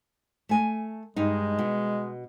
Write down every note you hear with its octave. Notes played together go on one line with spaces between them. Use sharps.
A3 G#5
G2 G#3 D#4
B2